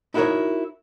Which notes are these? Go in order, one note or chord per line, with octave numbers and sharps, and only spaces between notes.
D#4 E4 F#4 A4 A#4 C#5